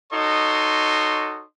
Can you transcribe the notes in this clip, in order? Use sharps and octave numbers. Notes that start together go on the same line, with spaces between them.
D#4 F#4 A4 C#5 D#5 C6